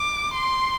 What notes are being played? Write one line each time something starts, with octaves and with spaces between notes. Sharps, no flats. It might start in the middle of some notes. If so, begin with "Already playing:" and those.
Already playing: D6
C6